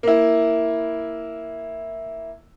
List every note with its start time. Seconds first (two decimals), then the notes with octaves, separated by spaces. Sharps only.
0.03 A#3 E4